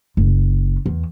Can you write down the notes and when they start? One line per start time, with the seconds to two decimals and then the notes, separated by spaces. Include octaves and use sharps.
0.17 F#1
0.86 E2